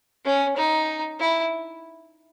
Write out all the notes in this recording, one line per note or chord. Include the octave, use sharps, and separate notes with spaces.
C#4
D#4
E4